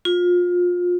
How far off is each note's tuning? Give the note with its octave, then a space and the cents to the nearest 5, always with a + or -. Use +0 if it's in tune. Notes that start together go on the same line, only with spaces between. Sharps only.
F4 +25